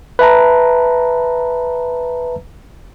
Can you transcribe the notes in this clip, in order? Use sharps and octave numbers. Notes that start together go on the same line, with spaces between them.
B4 E5 A5 A#5